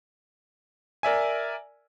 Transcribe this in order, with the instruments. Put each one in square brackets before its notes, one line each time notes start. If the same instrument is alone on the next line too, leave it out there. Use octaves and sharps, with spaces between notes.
[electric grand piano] A#4 D5 E5 G#5